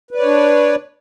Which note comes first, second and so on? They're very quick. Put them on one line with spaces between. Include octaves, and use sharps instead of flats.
B4 D5 C#5 D4